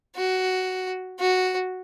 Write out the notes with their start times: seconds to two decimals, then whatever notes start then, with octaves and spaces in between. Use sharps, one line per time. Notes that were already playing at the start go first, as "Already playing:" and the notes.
0.16 F#4
1.20 F#4